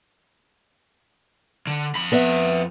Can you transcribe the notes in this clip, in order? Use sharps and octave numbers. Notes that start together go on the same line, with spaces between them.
D3
F2 B5
B3 E5